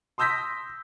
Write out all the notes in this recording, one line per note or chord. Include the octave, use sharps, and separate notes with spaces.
C6 D#6 E6 G6 A#6 B6